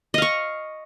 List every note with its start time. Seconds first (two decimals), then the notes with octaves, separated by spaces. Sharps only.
0.14 D#5
0.18 F5
0.22 C#6